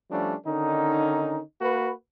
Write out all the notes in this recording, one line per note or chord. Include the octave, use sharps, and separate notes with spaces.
F3 G3 A3 C#4 D4
D3 D#3 C#4 D#4
A#3 F#4 B4